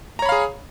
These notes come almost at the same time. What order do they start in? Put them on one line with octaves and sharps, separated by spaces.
A#5 C#5 B5 F5 G#4